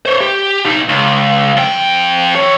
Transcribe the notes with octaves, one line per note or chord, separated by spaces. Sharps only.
C5 C#5
G4
B2 D#4
C#2
F2 G5
E3 C#5